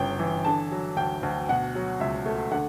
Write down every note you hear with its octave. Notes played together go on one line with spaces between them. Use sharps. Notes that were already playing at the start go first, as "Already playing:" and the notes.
Already playing: G1 F#2 C#3 G5
E3
D3 A5
F#3
D2 G5
D2
B2 F#5
F#3
C#2 E5
A3
D3 F#5